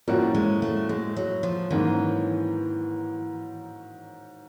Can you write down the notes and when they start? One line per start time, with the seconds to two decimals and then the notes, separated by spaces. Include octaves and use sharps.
0.08 A2 F3 G3 A#3 C#4 F#4
0.35 G#3
0.62 A3
0.89 G#3
1.17 F#3
1.43 F3
1.71 G#2 D#3 E3 F#3 A#3 C#4